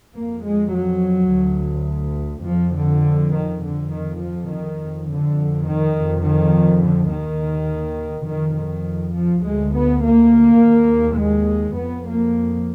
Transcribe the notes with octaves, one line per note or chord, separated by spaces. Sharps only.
F2 A#3
G#3
F#3
D2
F2 F3
D3
D#3
F2 D3
D#3
F3
D#3
F2
D3
D#3
F2
D#3
D3
D#2 D#3
F2 D#3
D#3
F3
D2 G#3
B3
A#3
D#2
G#3
F2 B3
A#3